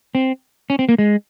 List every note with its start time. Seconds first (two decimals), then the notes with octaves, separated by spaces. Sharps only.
0.15 C4
0.70 C#4
0.79 C4
0.89 A#3
0.98 G#3